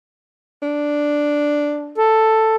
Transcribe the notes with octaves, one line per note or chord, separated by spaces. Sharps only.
D4
A4